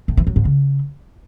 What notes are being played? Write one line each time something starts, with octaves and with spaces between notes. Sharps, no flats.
A2
E3
F#3
G#2
C#3